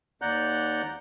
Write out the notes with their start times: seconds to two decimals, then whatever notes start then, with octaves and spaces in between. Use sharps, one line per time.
0.22 D#2 D5 F#5 A#5 F#6 G6